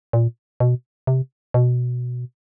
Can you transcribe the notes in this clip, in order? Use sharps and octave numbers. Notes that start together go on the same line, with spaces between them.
A#2
B2
C3
B2